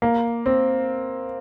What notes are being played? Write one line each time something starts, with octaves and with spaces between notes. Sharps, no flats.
A#3
C4